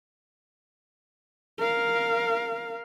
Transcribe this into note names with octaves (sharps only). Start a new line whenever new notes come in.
A#4 F5